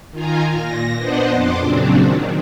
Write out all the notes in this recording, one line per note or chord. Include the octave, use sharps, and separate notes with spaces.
D#3 F4 G#5 A#5
A#2 A#6
B3 D4 C5 D#5 F#5
F2 C6 D6
A#2 C#3 F#3 C4 D4
D#3